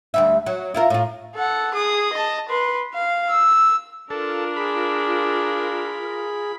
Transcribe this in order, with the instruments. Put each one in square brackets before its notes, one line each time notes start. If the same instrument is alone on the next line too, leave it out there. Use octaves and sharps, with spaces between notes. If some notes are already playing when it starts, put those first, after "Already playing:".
[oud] D2 G3 E5
F#3
E4 F4 A#4
A2 F4
[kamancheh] A4 F#5
G#4 D#6
D#5 A5
B4 C6
F5
E6
[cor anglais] D4 [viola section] F4 A#4 [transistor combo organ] A4
[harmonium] G#4 [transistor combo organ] B5